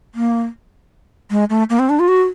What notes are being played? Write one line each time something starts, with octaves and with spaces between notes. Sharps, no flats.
A#3
G#3
A3
A#3
C4
D4
F4
F#4